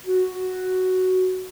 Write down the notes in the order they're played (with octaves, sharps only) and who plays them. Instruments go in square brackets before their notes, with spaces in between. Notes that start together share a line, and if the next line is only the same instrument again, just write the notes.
[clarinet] F#4